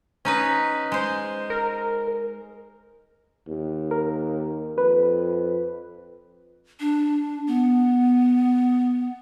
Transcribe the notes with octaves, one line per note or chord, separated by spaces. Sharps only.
C#4 D#4 B4
G#3 C5
A#4
D#2
A#4
F2 B4
D4
B3